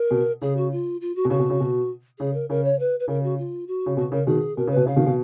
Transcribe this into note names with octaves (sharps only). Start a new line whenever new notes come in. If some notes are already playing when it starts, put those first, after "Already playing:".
Already playing: A#4
B2
C#3 G#4
F#4
F4
F4
F#4
B2
C#3 F#4
B2
C#3
B2
C#3 G#4
A#4
C#3 A#4
C#5
B4
B4
C#3 A#4
F#4
F4
F#4
C#3
B2 F#4
C#3 A#4
B2 D#3 G#4
B2 A#4
C#3
B4
B2
C#3 F5
B2 D#3
B2